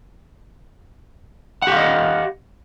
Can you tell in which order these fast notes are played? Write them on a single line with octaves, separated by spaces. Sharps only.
F#5 G4 F5 D#5